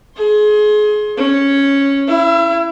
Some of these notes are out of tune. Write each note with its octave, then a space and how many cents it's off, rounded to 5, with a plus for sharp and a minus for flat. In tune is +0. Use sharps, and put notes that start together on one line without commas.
G#4 +25 C6 +25
C#4 +0 C#5 +0
E4 +5 E5 +40